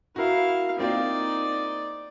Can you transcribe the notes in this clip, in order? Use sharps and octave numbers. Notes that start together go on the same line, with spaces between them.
E4 F#4 A#4 F5
A#3 C4 D#4 F4 D5